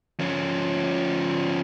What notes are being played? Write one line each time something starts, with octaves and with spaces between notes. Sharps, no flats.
F3 C#4